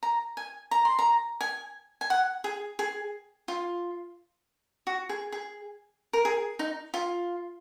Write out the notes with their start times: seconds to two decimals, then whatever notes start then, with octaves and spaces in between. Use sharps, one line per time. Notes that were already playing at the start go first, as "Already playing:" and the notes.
0.03 A#5
0.37 G#5
0.71 A#5
0.85 C6
0.99 A#5
1.41 G#5
2.01 G#5
2.10 F#5
2.44 G#4
2.79 G#4
3.48 F4
4.87 F#4
5.09 G#4
5.32 G#4
6.13 A#4
6.25 G#4
6.59 D#4
6.94 F4